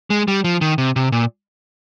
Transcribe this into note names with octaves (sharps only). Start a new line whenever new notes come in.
G#3
G3
F3
D#3
C3
C3
A#2